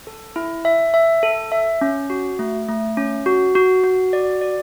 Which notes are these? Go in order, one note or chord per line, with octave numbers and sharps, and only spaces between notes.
A4
E4
E5
E5
A4
E5
C#4
F#4
A3
A3
C#4
F#4
F#4
F#4
D5
D5